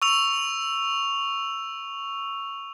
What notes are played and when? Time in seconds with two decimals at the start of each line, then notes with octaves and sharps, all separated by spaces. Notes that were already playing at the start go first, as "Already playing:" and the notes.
0.02 C#6 E6 F7